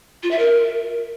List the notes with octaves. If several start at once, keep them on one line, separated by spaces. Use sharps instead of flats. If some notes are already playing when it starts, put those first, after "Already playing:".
F4
E5
A#4